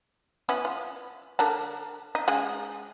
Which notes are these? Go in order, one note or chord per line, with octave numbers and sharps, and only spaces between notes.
B3 C#4 E4
F4
D3 A#4 A5
D#4
C#3 G#3 G#4